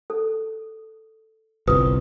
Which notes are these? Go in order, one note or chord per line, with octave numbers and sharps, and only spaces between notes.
A4
G1 C2 F4 B4 D#6